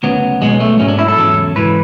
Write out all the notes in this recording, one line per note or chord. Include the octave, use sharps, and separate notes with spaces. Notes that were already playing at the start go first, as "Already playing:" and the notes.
D2 C#3 F#3 B3
B1 B2 F#3 G#3
A3
G#2 F#3 C#4
D4
E4
A4
E2 C#3 F#3
G#2 E3 B4